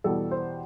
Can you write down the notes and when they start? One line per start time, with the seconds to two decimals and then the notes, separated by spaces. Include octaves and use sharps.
0.04 E2 B2 G3 A4
0.31 C5